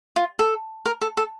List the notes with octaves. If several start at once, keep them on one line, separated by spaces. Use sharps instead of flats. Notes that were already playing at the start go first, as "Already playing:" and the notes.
F4
A4
A#4
A4
A4